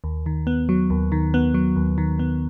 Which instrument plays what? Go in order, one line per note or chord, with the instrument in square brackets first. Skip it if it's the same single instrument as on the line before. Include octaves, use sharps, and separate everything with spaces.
[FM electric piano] D#2
D#3
B3
F#3
D#2
D#3
B3
F#3
D#2
D#3
B3